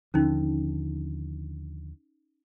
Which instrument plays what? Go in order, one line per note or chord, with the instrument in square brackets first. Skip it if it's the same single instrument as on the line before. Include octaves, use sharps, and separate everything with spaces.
[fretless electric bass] D#2 D3 F3 [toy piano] C#4 D#4